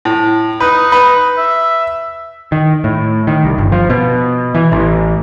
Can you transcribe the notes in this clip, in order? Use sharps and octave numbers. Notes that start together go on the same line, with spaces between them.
A2
D#4 B4
B4
E5
D#3
A2
D#3
C2
G1
F3
B2
E3
A1